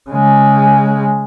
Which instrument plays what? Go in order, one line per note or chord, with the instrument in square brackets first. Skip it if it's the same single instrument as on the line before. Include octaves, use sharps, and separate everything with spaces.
[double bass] C#3 G#3